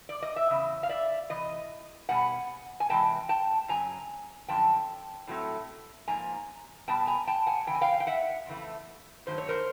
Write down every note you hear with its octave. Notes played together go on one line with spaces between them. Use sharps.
D5
D#5
E5
E2 C#3
F5
D5 E5
C3 E3 D#5
B2 G3 B3 F#5 G#5
G#5
E2 C3 E3 G#3 G5 A5
G5 A5
F#2 C#3 F#3 G#5 A#5
F#2 D3 F3 G5 A5
A2 F#3 A3 C4
G#2 F3 A#3 G#5 A#5
B2 G3 B3 G5 A5
G#5 A#5
G5 A5
F#5 G#5
C#3 E3 G5
G#5
F5 G5
G5
E5 F#5
F2 C#3 E3 A3
G2 D#3 F#3 A3 C5
C#5
A#4 C5